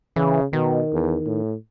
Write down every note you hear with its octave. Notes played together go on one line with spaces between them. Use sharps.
C#3 E3
B2 D#3
E2
A2